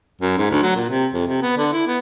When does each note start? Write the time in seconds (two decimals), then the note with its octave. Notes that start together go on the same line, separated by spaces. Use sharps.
0.21 F#2
0.38 G#2
0.50 D2
0.62 F#3
0.76 A#2
0.90 C3
1.14 F2
1.27 C3
1.42 B3
1.57 D3
1.73 E4
1.87 B3